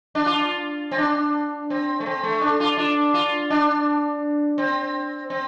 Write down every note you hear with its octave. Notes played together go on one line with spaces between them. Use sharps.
D4
F4
C4
D4
C4
A3
C4
A3
D4
F4
D4
F4
D4
C4
C4